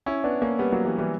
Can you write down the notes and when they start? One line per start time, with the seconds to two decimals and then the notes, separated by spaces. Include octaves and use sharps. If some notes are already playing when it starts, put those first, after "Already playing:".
0.06 C#4 E4
0.24 B3 D4
0.42 A#3 C#4
0.59 G3 B3
0.72 F#3 A#3
0.85 E3 G3
0.98 E3 G3